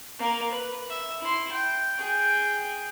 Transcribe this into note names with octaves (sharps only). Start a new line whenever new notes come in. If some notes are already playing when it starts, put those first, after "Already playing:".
A#3 A#4
B4
E5
E4 C6
G5
G#4 G5